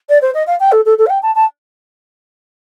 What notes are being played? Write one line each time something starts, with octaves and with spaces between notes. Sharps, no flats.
D5
C5
D#5
F5
G5
A4
A4
A4
F5
G5
A5
A5